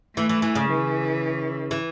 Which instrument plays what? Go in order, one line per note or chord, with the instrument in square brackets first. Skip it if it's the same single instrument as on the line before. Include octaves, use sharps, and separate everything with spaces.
[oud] E3 [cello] A3
[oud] E3
E3
C#3
[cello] E3
[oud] E3